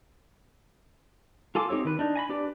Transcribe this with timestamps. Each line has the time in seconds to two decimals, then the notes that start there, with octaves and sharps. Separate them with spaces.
1.55 F4 A4 G#5 D6
1.69 C4 D#4 G4 C#5 E6
1.85 D#3 B4
1.99 D4 D#4
2.16 G#5 A#5 B5
2.29 D4 G4 B4 D5